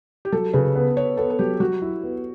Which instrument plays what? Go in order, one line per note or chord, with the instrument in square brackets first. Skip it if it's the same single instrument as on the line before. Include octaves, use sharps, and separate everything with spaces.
[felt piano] G4
[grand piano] F#3 [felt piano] A4
[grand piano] C#3 [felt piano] B4
[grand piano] B3
[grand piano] B3 [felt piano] C#5
[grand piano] B3 [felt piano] A4
[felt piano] A4
[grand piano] F#3 [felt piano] G4
[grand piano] F#3 [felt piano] F#4
[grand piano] E4
B3